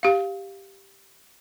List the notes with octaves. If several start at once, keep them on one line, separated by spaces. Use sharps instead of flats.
G4 F5